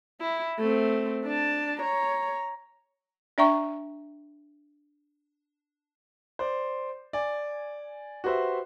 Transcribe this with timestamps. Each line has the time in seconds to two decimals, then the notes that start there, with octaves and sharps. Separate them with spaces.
0.21 E4
0.59 A3 C4
1.24 D4 A5
1.80 C#5 A#5
3.38 D4 D5 E5 G5 A#5 C#6
6.39 C5 D5
7.13 D5 G#5
8.24 F#4 G4 B4 C5 E5